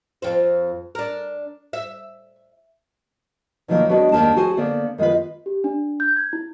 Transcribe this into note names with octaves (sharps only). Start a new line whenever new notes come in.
F2 F4 C5
D4 A#4
E5
B2 D3 D#3 F3 F#3 A#3
G#3 B3 D4 F#4 B4 C#5
D#2 G#3 A#3 D4 A5
F#4 G#4 C5 G#5
D3 A#3 B3 C5 D5
D#3 G#3 B3 F4 B4
G4
D4
G6
G#6
E4